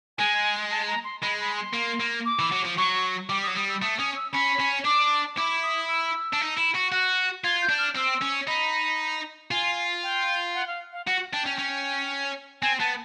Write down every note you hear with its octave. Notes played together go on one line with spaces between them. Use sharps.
G#3 G#5
A5
A#5
C6
G#3 B5
B5
C6
A#3
A#3
D6
E3
F#3
F3
F#3 C#6
G3 D6
D#6
F#3
G3 D#6
E6
A3 D#6
C#4 D#6
E6
C#4 B5
C#4
D4 D6
E4 D6
D#6
E6
D4
D#4
E4
F#4
F#4 F#6
F4 G#6
G6
D4
F6
C4 E6
C#4
D#4 B5
F4 G#5
G5
F#5
F5
F5
F#4 F#5
D4 G5
C#4
C#4
C4 G#5
B3 A5